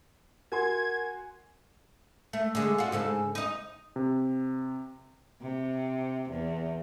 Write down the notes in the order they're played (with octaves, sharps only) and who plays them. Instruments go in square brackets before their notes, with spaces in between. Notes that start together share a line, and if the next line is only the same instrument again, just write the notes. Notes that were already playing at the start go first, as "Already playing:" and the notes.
[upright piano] F#4 G#5 C6 [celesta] A#4 [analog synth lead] G#6
[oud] A3
D3 G#3
F4 F#4
G#2 C#3 A4
D#4 D#5
[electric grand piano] C3
[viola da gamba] C3
E2